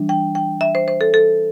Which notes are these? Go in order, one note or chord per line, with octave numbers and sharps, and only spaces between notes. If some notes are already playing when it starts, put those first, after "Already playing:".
Already playing: E3 G3 D4
G5
G5
E5
C5
C5
A4
A4